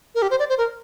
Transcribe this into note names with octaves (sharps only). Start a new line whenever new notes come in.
A#4
G4
C5
D5
C5
A#4